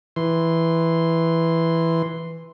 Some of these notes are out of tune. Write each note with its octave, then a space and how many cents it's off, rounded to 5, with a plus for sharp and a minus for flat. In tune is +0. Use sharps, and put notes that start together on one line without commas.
E3 +0 C6 +0